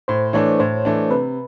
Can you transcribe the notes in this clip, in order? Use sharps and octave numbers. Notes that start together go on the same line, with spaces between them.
A2 C5
E3 A3 D4 C#5
A2 C5
E3 A3 D4
C3 B4